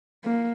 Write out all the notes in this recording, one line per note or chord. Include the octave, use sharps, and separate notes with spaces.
A#3